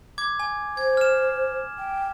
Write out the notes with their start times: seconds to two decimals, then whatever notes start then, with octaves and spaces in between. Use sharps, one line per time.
0.18 D6 G#6
0.39 G#5
0.77 C5 G#6
0.97 F6 E7
1.78 G5